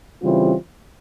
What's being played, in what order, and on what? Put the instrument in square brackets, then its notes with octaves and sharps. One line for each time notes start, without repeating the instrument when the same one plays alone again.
[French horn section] C#3 E3 G3 C4 F4